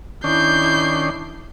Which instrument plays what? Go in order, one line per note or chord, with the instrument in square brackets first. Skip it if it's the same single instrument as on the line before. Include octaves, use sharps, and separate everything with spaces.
[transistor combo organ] D#3 C#4 D4 [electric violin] E4 C7 [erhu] G6